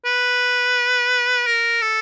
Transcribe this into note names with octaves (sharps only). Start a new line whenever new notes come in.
B4
A#4
A4